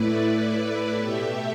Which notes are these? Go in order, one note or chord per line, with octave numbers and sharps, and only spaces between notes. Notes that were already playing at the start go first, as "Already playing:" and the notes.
Already playing: A2 A3 E4 B4 D5
B2 A3 G4 E5